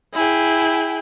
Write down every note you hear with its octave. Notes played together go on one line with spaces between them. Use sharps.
E4 G#4 G5